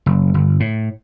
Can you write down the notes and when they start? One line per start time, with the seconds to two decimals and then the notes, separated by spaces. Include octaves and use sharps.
0.06 F#1
0.34 G1
0.60 A2